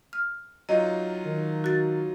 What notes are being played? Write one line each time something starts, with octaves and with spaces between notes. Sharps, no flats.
F6
F#3 D#4 F4 D#5
D#3
F#4 A6